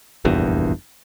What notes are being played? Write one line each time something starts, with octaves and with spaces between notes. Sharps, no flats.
F1 A#1 E2 G2